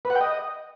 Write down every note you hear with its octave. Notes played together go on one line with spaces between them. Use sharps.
B4
F#5
G5
D#5